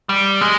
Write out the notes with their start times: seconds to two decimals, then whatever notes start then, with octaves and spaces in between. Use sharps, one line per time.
0.09 G3
0.41 G#3